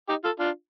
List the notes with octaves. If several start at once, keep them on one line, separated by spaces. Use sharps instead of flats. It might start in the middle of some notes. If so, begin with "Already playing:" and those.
D#4 G4
F4 A4
D4 F4